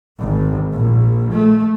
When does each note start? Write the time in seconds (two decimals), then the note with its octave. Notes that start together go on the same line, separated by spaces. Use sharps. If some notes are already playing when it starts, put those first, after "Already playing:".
0.19 G#1
0.71 A#1
1.31 A3